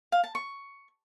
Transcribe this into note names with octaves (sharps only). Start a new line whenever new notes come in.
F5
A5
C#6